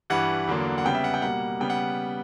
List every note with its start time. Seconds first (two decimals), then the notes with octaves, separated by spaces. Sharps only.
0.10 G2 E3 G3 F#5
0.47 E2 D3 F#3 A#3
0.78 F#5
0.85 C#3 G3 B3 G5
0.95 E5
1.04 F#5
1.14 G5
1.22 B2 G3 A#3 F#5
1.60 C#3 G3 B3 G5
1.70 F#5